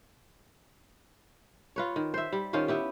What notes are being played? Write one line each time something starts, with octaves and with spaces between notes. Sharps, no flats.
F4 B4 C#5
D#3
C5 E5
G3
D#3 C#4 F4 C5
B3 E4 G4